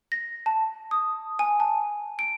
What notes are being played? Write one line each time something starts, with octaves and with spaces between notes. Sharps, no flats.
A#6
A5
D#6
G#5
A5
D7